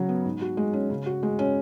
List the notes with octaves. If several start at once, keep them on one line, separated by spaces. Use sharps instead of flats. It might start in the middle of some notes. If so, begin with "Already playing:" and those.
Already playing: C#3 F#3 F#4
B3
G#2
F#4
G#3
C#4
C#3
F#4
G#3
C#4